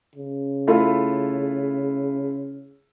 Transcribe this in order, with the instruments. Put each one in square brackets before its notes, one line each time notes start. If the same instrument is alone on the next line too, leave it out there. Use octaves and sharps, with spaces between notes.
[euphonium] C#3
[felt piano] A3 E4 F4